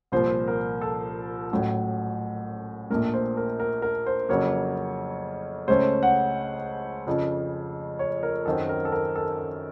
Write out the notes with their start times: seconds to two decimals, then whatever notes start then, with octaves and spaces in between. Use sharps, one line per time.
0.12 C2 A#2 F3 C5
0.48 A#4
0.81 A4
1.52 A1 A2 F#3
2.90 A#1 A#2 A3 A#4
3.14 C5
3.37 A#4
3.60 A#4
3.82 A#4
4.06 C5
4.29 F2 C#3 F#3 A#3 C#5
5.68 C#2 C#3 A3 C#4 C5
6.03 F#5
7.07 F2 C#3 F3
7.99 C#5
8.23 A#4
8.46 F#2 D#3 F#3 C4 A4
8.69 A#4
8.85 A4
8.92 A#4
9.16 A4
9.39 A4